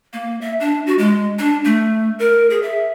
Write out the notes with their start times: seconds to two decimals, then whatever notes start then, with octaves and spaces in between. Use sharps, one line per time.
0.13 A#3
0.41 E5
0.60 D4
0.87 F#4
0.98 G#3
1.39 D4
1.65 A3
2.19 A#4
2.50 G#4
2.63 E5